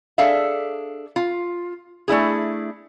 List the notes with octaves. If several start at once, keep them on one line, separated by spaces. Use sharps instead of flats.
D4 G#4 A4 E5 F5
F4
A3 D4 E4 G#4